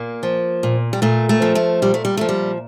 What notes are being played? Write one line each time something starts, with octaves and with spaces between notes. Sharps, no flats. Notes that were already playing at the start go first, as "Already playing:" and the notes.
Already playing: A#2 A#3
F3
A#2
G3
A#2 A3
A3
F3
A3
A#2 G3
A3
G3
F3 A3
G3